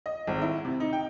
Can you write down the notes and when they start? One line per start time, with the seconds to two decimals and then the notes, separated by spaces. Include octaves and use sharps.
0.06 D#5
0.27 G#1
0.42 E4
0.65 C3
0.80 D#4
0.93 G5